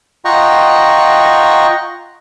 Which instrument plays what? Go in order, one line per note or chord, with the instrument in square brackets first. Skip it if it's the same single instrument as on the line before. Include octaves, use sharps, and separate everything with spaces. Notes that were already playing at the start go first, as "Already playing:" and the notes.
[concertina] F4 D#5 F#5 G5 A#5 C#6